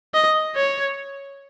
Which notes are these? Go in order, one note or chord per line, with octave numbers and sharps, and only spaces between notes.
D#5
C#5